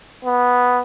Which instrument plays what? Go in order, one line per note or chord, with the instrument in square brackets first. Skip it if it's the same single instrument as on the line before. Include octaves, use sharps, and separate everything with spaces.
[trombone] B3